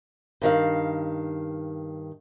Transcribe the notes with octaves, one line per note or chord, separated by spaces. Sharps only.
G2 D#3 F5